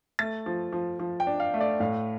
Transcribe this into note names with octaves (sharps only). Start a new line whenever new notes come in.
A3 A6
F3
F3
F3
G5
D4
F5
A3
D5
A2 F5